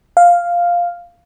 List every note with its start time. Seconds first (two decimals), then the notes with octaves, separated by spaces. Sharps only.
0.17 F5